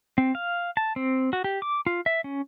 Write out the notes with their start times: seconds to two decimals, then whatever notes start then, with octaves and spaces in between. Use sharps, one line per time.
0.18 C4
0.35 F5
0.77 A5
0.96 C4
1.33 F#4
1.44 G4
1.62 D6
1.87 F4
2.06 E5
2.24 C#4